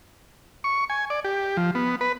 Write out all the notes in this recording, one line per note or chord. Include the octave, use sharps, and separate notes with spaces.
C#6
G#5
D5
G4
F3
B3
B4